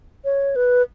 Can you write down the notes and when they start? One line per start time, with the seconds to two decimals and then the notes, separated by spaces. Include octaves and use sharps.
0.25 C#5
0.56 B4